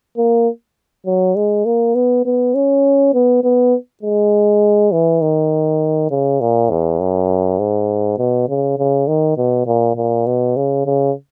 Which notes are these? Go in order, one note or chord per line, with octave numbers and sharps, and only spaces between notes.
A#3
F#3
G#3
A#3
B3
B3
C#4
B3
B3
G#3
E3
D#3
C#3
A#2
E2
F#2
G#2
B2
C#3
C#3
D#3
B2
A#2
A#2
B2
C#3
C#3